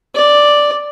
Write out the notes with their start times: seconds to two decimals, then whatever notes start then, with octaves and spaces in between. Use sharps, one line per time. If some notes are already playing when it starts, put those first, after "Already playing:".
0.16 D5